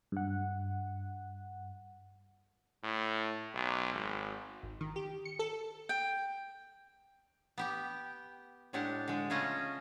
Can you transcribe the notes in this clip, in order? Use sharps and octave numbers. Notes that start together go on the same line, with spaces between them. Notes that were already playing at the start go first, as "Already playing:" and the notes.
G2 F#5
A2
B1
G#1
G#1
D#3
G4
C#7
A4
G5
B3 G4 G5
A2 G#3 D4 G4 F#5
D3 G#3
C#3 A3 C#4 F4 D#5